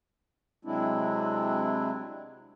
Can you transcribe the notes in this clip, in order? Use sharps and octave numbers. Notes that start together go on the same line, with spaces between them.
C3 F#3 G#3 C4 D4 E4